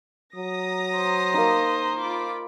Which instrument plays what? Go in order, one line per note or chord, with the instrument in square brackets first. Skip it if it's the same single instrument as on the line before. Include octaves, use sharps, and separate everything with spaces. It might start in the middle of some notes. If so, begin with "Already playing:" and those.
[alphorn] F#3 [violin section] A#5 D#6 A#6
[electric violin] C5
[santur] A#3 D#4
[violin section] F4 B5 D6